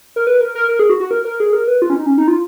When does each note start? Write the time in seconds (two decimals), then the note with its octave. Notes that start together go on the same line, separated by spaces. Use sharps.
0.16 A#4
0.27 B4
0.41 A#4
0.55 A#4
0.68 A#4
0.79 G#4
0.90 F#4
1.00 F#4
1.11 A#4
1.25 A#4
1.40 G#4
1.53 A#4
1.68 B4
1.82 F4
1.90 C#4
1.96 D#4
2.06 C#4
2.18 D#4
2.28 F4